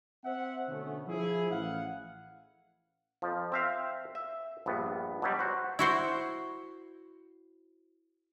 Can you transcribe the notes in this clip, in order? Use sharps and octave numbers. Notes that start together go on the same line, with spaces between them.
C4 C5 E5 F#5
B2 D3 A3 B3 C#4
F3 E4 G#4
A1 F5 F#5
F2 F3
C4 E5 F5
E5
A#1 G2 B3
B2 F#3 G3
F#4 C5
E4 F#4 C5